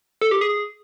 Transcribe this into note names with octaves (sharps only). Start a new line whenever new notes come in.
A4
G4
G#4